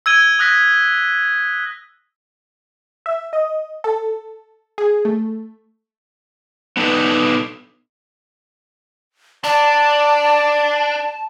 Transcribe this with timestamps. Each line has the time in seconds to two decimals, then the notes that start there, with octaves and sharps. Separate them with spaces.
0.06 E6 G#6 D#7 G7
0.39 D#6 F#6 A#6 B6
3.06 E5
3.33 D#5
3.84 A4
4.78 G#4
5.05 A3
6.77 B3 D4 D#4 A4 B4
9.44 D4 D5 A5